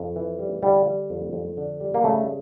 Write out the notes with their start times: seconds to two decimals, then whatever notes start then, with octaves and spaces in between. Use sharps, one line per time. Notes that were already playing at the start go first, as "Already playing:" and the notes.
Already playing: F2
0.16 E3
0.39 G3
0.63 D3 G3
0.86 G3
1.10 F2
1.33 F2
1.57 D3
1.81 G3
1.94 A#3
2.04 C#3 A3